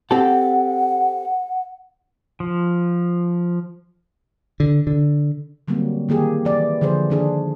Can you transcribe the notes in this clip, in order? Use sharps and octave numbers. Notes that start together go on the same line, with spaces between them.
C4 G4 A4 F#5
F3
D3
D3
D3 F#3 G3 A#3 C4
D#3 A#3 G4 G#4
E3 D5
D3 F3 G#4 C5
D#3 D4 G#4